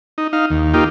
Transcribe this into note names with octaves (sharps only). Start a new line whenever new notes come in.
D#4
D#4 F5
D#2
A#3 D#4 F4 G4